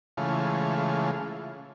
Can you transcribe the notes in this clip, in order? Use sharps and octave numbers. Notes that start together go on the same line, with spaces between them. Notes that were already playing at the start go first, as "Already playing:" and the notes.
C#3 E3 G#3 A3 F4